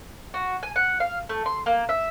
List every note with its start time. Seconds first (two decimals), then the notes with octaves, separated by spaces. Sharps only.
0.34 F#4
0.63 G#5
0.76 F#5
1.00 F5
1.29 A3
1.46 C6
1.66 A#3
1.89 E5